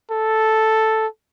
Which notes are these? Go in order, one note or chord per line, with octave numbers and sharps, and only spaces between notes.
A4